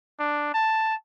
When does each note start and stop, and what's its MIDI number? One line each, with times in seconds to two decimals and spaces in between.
0.19 0.50 62
0.54 0.94 81